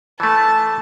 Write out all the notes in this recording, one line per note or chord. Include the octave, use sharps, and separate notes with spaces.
E3 A3 A5